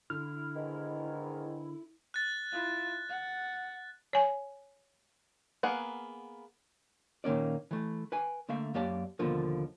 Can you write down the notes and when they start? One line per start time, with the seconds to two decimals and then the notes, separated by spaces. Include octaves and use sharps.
0.10 D3 E4 F6
0.55 E2 G#2 D#3
2.14 F#6 A6
2.52 E4 F4
3.09 F#5
4.13 C#5 G#5
5.63 A#3 B3 G#4 F#5
7.24 A#2 D#3 A#3 C#4 D5
7.71 E3 A3
8.12 B4 G5 G#5
8.49 D3 A3 A#3 E5 F5
8.74 F#2 A#3 G4 D5 A5
9.19 D#2 B2 D3 F3 A#3